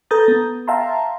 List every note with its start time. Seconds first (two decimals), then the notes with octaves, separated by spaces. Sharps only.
0.11 A4 B4 A#5 D#6 G6 A6
0.28 B3
0.68 E5 F5 G5 A5 A#5 C6